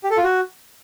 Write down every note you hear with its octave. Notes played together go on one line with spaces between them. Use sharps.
G4
A4
F4
F#4